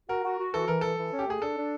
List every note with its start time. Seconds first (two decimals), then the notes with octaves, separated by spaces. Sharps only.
0.09 F#4 A#4
0.24 F#4
0.39 F#4
0.54 E3 A4
0.68 E3 A#4
0.81 E3 A4
0.98 E3
1.12 C#4
1.19 G4
1.27 A3 G#4
1.42 D4 A4
1.57 D4